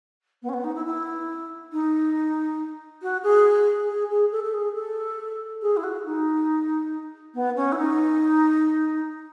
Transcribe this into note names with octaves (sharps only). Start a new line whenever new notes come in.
B3
C#4
B3
D#4
E4
E4
D#4
F#4
G#4
G#4
G#4
A4
A4
G#4
A4
G#4
E4
F#4
D#4
B3
C#4
E4
D#4